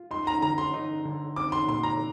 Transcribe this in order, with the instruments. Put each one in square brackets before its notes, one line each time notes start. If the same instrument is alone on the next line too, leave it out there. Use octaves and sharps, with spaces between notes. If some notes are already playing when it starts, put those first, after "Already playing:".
Already playing: [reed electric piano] F4
[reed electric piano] D#4 [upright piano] C6
[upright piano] A#5
[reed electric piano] D3 [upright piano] A#5
[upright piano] C6
[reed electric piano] D#4
D3
[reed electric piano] C4 [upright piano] D6
[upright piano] C6
[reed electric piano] A#2 [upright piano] C6
[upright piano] A#5